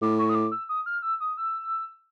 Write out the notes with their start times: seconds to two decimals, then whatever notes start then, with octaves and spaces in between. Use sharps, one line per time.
0.02 A2 D6
0.19 C#6
0.29 D#6
0.35 D6
0.52 E6
0.69 D#6
0.86 F6
1.02 E6
1.21 D#6
1.37 E6